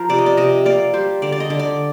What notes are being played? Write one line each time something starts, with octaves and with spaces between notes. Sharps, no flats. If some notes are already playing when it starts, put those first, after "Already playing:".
Already playing: F3 A#4 C5
C3 D5
D#5
D5
C3 D#5
A#3 D5
G3 C5
D3 D5
D5
D#5
D3
D5